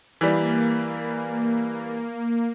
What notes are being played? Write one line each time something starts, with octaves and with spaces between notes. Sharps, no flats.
E3 G3 A#3